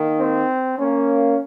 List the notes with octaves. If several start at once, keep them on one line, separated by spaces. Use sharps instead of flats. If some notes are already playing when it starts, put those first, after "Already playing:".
Already playing: D#3 A#3
C4
A#3 C#4